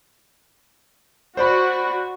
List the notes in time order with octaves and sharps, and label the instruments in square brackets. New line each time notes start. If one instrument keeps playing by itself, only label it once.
[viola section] F#4 [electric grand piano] C5 D5 B5